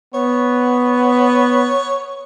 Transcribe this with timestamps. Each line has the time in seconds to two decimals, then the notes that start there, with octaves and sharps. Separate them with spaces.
0.14 B3 C#5